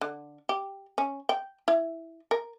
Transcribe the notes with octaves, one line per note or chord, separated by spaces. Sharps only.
D3
G4
C#4
G5
E4
A#4